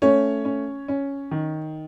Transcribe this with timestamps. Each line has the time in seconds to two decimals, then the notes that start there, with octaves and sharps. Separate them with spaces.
0.02 A3 C#4 C#5
0.45 C#4
0.88 C#4
1.31 D#3